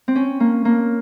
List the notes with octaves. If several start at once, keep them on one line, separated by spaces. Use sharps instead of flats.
C4
C#4
A#3
A#3